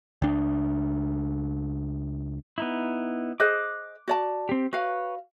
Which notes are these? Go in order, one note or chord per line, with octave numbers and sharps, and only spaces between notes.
C#2 D4
B3 D#4 E4
G#4 C5 D#5 D6 F#6
F#4 D5 A5
C4 G4
F#4 B4 C#5 F5